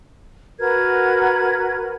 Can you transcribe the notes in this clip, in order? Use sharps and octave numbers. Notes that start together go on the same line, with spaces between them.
F#4 A#4 B4 G#6